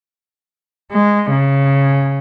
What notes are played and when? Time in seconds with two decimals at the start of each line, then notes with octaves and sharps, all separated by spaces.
0.92 G#3
1.31 C#3